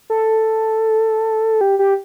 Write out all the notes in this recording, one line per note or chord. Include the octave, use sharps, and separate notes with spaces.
A4
G4
G4